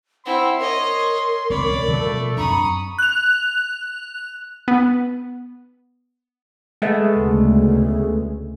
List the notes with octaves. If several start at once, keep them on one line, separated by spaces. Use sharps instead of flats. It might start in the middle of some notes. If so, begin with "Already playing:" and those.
C4 E4 F#5 C6
A#4 C#5 D#5
E1 C#2 C4 C#5 D5 B5
B2 F3 G3 A3
F#2 C4 D4 A#5 B5 C#6 D#6
F#6 F7
B3
G#3 A3 B3
D2 C#3